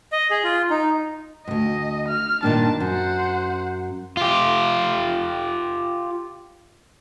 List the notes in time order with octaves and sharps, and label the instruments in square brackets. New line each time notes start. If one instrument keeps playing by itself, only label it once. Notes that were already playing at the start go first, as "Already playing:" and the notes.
[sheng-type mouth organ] D#5
G#4
F4
D#4
[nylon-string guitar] D2 G#2 [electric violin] D#5
[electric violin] F6
[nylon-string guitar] G2 A#2 D#3 [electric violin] D4 A5
[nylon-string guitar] F#2 [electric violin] C5 F#5
[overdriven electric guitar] F4 G4